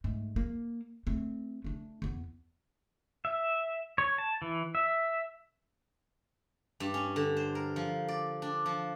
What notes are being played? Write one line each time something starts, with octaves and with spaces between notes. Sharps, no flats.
G#2 A3
A#3
A3 C4
A3 D4
E2 B3
E5
C#5
A5
E3
E5
G2
C#4
D3
C5
A#4
F3
D5
D4
F3